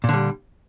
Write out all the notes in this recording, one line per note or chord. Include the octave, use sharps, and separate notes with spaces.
A#2 D3 G3